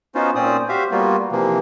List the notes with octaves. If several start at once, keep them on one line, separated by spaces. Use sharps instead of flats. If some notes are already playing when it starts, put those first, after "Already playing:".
B3 C#4 D#4 F4 F#4 C5
A#2 C4 C#4 C5 D5 D#6
F#4 G4 C5 E5 F5
G3 A#3 B3 F4 F#4
C3 E3 F3 A#3